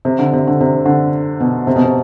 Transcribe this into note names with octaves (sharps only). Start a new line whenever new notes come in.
C3
D3
C3
D3
C3
D3
B2
C3
B2
C3